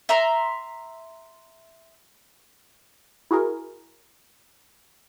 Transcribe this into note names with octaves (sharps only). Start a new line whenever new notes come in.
E5 A#5 C6
E4 F#4 G#4 A#4